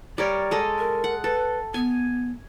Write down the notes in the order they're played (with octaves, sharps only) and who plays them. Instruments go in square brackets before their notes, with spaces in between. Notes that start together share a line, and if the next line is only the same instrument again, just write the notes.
[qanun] G3 A#4 C#5 [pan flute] D5
[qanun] G#3 A4 D#5
[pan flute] A#4
[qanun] F#5
[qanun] A4 [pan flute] B4
[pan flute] B3 [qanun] G#5